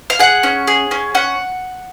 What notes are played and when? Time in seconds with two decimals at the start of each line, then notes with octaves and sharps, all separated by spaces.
0.10 F5
0.19 G#4 F#5
0.43 C#4
0.67 G#4
0.91 C#4
1.15 C#4 F#5